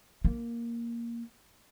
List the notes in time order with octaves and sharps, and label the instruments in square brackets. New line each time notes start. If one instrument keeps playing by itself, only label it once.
[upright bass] A#3